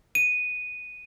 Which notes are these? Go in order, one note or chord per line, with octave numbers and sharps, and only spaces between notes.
D#7